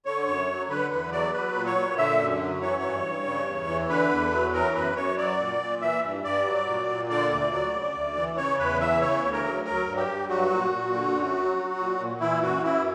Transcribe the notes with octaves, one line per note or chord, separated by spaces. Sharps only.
D3 C#5
F#2
F#3
D3 B4
E2 B4
F#3 D5
F#3 B4
A#2
C#5
A#2
D3 E5
F#2
F#3
E3 C#5
G2
G2
C#3
E2
E3
D3 B4
E2
F#3
E3 A#4
F#2 B4
F#2 C#5
F#3 D5
A#2
A#2
E3 E5
G2
G2 D5
F#3
A#2
A#2
D3 D5
D2
F#3
C#3
D2
E3
C#3 C#5
E2 B4
E3 E5
C#3 C#5
D2
A#4
F#3
F#3 A#4
G2
G4
G2
F#3 F#4
A#2
A#2
D3
F#2
F#3
F#3
A#2
A#2
E3 E4
F#2 F#4
F#2 E4